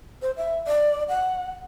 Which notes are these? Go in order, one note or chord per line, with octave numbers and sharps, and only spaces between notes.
C5
E5
D5
F#5